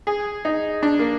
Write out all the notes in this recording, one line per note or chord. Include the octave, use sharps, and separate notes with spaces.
G#4
D#4
D4
A#3